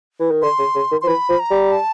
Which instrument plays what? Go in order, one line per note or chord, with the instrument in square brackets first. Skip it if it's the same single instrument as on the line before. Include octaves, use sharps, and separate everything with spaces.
[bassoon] E3
D#3
[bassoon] D3 [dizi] C6
[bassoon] C#3
C#3
D#3
[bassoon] F3 [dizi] C6
[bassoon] E3 [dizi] B5
[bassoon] F3
[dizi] A#5
[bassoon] G3
[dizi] A5